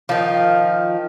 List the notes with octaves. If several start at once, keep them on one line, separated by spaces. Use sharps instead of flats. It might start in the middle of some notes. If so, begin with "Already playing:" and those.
D#3 F3